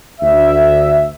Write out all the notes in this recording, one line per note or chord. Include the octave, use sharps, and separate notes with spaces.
D2 D3 E5